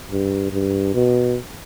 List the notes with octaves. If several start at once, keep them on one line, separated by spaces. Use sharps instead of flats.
G2
G2
B2